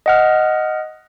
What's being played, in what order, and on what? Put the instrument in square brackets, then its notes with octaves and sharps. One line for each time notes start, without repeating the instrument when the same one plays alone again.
[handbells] D#5 F#5 F6